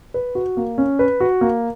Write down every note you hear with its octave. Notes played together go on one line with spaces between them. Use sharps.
B4
F#4
A#3
C#4
B4
F#4
A#3